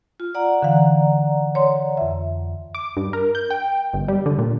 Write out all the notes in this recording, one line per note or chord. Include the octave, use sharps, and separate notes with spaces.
F4
D5 F#5 A#5
D3 E3 F5
C#5 C6
F2 E5
D6
G2
A#4
G6
G5
G1
G3
D3
A#2